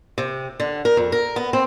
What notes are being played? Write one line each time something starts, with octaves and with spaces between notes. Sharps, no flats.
C3
D3
A#4
F2
A#4
B3
C4